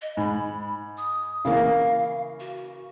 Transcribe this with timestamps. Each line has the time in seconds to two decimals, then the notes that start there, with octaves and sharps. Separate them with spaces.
0.02 D#5
0.17 G#2 B5
0.97 D#6
1.45 C#3 E3 A#3 F5
2.40 F#4